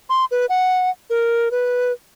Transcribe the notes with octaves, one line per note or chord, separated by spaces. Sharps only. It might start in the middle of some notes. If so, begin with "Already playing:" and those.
C6
B4
F#5
A#4
B4